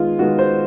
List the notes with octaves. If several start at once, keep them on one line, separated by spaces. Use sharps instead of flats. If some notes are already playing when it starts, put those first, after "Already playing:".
Already playing: D#3 G#3 B3 F4
D#3 G#3 B3 F#4
C5